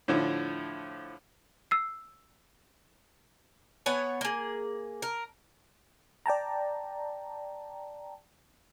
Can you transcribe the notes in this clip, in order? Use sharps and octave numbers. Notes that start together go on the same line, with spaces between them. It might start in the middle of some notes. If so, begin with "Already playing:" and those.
A2 D3 F3
E6 C7
B3 C#5 F#5 G#5
A#3 G#4
A#4
D5 G5 A5 A#5